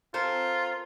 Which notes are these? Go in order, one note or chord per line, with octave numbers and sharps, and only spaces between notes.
C4 F4 A4 A#4